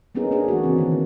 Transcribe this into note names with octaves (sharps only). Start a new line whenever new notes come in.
A#3 B3 C#4 D#4 G#4 A#4
A#3 D4 G#4
E3 A3 F#4
C#3 E3 C4
D#3 A#3
C4